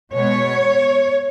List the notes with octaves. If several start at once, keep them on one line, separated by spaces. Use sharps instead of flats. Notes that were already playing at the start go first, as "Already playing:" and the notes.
B2 G#3 B3 C#5